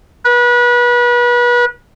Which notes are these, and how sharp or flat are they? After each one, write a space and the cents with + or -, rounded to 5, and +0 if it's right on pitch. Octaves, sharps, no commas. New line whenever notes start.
B4 -30